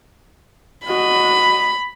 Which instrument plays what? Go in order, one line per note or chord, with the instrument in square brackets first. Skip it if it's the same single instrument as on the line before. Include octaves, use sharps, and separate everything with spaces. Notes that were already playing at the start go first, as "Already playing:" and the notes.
[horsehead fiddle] F#4 D#5 [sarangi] B5